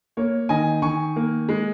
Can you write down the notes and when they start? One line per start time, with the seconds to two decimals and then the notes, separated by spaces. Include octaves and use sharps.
0.17 A#3 C#5
0.49 D#3 D#5 G#5
0.82 D#3 G#5 C#6
1.16 A#3
1.49 G#3